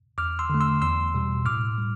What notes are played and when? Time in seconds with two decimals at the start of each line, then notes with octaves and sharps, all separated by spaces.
0.18 E2 D6 F6
0.39 C6 E6
0.50 D3 A3
0.61 C6 E6
0.82 E2 C6 E6
1.15 B2 G3
1.45 A2 D6 F6
1.78 G3